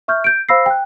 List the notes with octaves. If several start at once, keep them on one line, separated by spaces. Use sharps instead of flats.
E5 C#6 F6 G6
G6 D7
C5 F5 B5 E6 A#6 C7
G5 F#6